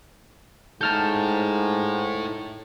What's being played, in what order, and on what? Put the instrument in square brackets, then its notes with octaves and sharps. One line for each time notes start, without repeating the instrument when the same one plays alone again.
[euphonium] G#2 [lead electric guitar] E4 A4 [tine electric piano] A5 F6 G6